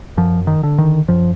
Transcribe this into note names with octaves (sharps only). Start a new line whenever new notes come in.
F#2 F3
D#3
D3
D#3
F#2 F3